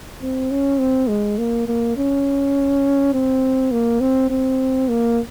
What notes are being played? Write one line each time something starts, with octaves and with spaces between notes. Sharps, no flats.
C4
C#4
C4
G#3
A#3
A#3
C#4
C4
A#3
C4
C4
A#3